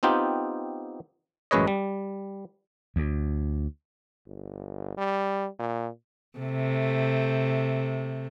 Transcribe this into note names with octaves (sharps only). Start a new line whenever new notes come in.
B3 C4 D#4 F4 G4
A1 F#2 G#3 B4 C#5 D#5
G3
D2
G1
G3
A#2
C3 A3